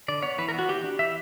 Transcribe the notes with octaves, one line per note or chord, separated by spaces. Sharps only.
D3 D5
B3 C#5
E3 B4
A#4
B3 F#4
E3 G4
D4
E3 E5